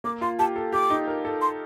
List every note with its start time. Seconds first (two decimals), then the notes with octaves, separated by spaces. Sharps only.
0.04 A#3 D6
0.21 F4 C6
0.39 G4 A5
0.56 A4
0.72 G4 D6
0.90 D#4
1.08 A#4
1.25 A4
1.41 C6